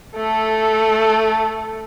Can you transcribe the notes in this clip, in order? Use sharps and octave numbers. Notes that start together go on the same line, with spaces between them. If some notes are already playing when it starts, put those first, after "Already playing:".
A3 A4